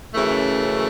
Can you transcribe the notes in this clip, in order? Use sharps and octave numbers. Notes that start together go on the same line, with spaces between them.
F#2 C#3 E3 A3